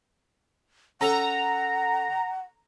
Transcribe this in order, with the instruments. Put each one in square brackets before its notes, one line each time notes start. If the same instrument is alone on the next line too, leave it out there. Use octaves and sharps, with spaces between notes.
[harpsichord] C#4 A4 [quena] F#5 [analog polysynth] A#5